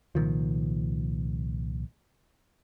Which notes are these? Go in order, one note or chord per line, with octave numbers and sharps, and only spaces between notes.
C2 A#2 D#3 F3